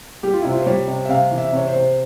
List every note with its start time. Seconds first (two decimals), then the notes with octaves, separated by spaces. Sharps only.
0.23 G3 G4
0.33 F4
0.42 C3 E4
0.52 F4
0.62 C5
0.67 G3 C#5
0.88 C3
1.05 E5
1.09 C3 F5
1.31 E3
1.38 E5
1.53 C3 C#5
1.67 C5
1.74 C3